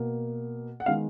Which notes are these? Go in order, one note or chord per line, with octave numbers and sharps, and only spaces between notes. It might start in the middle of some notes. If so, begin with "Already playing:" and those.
Already playing: B2 A#3
F#5
D#3 G#3 B3 F5